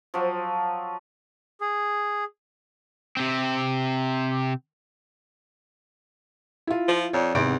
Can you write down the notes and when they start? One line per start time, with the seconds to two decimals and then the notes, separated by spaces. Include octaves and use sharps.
0.14 F3 F#3
1.61 G#4
3.17 C3 C4
6.67 E4 F4
6.88 F3
7.13 F2 C#5 D5
7.34 G#1 E2 C3 D7